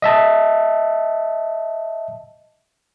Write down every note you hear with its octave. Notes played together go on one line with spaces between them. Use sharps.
D#5 E5 A5